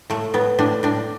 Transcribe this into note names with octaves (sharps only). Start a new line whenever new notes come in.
A2 A3
A2 B3
A2 D4
A2 D4